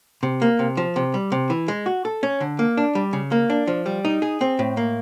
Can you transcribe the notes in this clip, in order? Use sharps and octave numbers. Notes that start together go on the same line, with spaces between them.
C3
A#3
C3
F3
C3
G3
C3
E3
G#3
F#4
A4
C#4
D3
A#3
D4
G3
C#3
A#3
D4
F3
G3
D#4
G#4
C4
A2
A#3